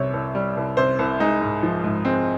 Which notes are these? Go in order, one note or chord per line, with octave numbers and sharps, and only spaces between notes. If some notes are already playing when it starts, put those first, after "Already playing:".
Already playing: C2 C3 G3 C#5
C2
G3
C2
C3 C5
C2
G#3 D#4
G#2
F3
G#2
G#3 C4